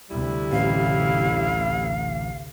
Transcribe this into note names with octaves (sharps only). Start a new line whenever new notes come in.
D2 C3 G3 E4
A1 F5